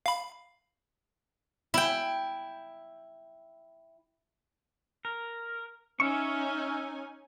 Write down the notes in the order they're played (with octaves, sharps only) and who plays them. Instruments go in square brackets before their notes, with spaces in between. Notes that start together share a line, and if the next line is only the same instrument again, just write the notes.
[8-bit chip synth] F5 B5
[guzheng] E4 G5
[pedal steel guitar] A#4
[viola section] C#4 D#4 G#5 [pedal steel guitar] C#5 E5 C#6